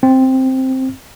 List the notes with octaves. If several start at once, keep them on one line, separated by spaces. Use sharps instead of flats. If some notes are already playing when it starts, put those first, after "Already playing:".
C4